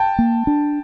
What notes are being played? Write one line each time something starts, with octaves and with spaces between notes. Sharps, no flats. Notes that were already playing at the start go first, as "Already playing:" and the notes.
Already playing: G5 A5
A#3
D4